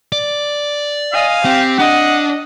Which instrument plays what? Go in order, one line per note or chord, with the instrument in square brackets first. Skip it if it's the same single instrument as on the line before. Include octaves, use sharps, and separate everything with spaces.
[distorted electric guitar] D5
[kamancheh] D#5 G#5 [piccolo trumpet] F5
[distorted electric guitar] C4 [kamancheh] G4
[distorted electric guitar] D4 [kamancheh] D#5 [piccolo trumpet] F#5